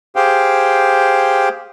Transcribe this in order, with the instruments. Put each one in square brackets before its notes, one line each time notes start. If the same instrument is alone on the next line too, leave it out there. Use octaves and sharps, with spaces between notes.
[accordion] G4 G#4 C5 F5 G5